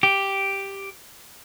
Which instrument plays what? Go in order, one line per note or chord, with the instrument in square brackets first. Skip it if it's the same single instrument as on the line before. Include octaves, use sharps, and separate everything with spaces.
[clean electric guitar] G4